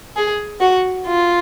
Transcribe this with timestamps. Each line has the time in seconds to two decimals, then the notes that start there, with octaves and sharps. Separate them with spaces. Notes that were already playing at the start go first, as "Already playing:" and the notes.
0.16 G#4
0.61 F#4
1.06 F4